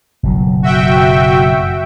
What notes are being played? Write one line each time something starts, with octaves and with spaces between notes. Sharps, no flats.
F#1 B2 F#3
F#4 E5 G5